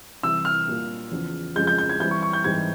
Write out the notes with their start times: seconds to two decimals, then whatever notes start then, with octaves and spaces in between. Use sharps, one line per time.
0.23 C3 E3 G3 E6
0.45 F6
0.68 A#2 G3 A#3 F4
1.11 E2 C#3 F3
1.56 F2 C#3 F3 G#3 G6
1.67 G6
1.78 G6
1.89 G#6
2.00 E3 G3 C4 G6
2.11 C#6
2.22 C#6
2.33 G6
2.44 G#2 E3 G3 C4 G#6